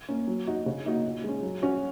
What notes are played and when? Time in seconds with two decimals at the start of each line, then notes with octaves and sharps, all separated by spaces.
0.09 A#3 C#4
0.28 F#3
0.47 D#4 F#4
0.66 C#3
0.85 A#3 D#4 F#4
1.04 A#2
1.24 G#3 C#4
1.43 F#3
1.62 C#4 F#4